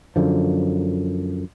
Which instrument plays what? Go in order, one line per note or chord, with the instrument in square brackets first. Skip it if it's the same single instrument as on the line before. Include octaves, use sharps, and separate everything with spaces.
[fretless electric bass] F#2 D3 F3